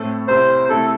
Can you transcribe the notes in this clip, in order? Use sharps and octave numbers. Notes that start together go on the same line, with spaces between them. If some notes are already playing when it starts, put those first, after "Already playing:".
Already playing: A2 A3 C4 A4
C2 C3 G3 E4 C5
C3 A3 E4 A4